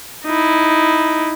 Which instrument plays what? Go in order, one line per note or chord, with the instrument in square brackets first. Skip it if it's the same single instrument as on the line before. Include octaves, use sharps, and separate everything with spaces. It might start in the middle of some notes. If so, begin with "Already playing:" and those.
[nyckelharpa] D#4 E4